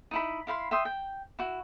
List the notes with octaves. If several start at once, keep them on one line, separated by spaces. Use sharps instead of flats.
D#4 E4 B5
E4 F5 B5 C6
E5 G5 C6 D#6
G5
E4 F#4